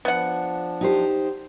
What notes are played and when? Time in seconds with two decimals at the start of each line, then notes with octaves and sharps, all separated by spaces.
0.05 F3 B3 D4 F#5
0.81 D#4 G4 C5